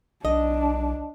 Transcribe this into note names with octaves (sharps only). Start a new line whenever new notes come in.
B1 D4 D#5